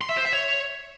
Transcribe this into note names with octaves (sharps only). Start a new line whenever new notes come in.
C6
E5
C5
E5
C#5